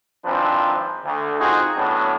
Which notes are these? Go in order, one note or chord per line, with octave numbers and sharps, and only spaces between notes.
G#1 F3 C4 D4 B4
D2
C4 D#4 F4 F#4 G#4
A2 F#3 B3 C#4 D4